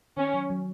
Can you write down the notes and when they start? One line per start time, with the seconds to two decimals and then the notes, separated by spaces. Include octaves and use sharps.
0.17 D#3 C#4
0.34 F#3
0.50 F#3